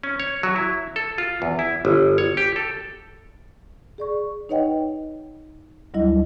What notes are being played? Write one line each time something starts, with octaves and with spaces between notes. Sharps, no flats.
C#4
C#5
F#3
E4
A4
F4
E2
E4
G1
C#5
G4
A4
G#4 D5 C#6
D#4 B4 C#5 D#5 F#5 G5
D2 F#3 G3 E4 D#5